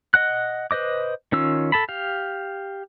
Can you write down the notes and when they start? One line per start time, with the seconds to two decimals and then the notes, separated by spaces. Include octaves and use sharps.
0.14 D#5 F#5 F#6
0.71 B4 C5 D#5 D6
1.32 D#3 C#4 F4 E6
1.72 A4 A5 B5
1.89 G4 F5